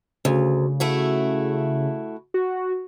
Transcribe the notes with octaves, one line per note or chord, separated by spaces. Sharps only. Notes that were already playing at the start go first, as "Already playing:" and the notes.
D2 C#3
A3 E4 F#4
F#4